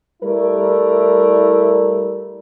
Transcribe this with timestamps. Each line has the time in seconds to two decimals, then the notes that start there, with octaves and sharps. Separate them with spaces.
0.23 G3 A3 E4 A#4 D5